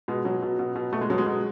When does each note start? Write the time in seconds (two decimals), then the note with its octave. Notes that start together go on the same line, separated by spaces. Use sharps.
0.08 B2 G#3
0.25 B2 F#3
0.42 B2
0.59 B2
0.76 B2
0.93 B2 A3
1.01 G#3
1.10 B2 F#3
1.18 G#3
1.26 B2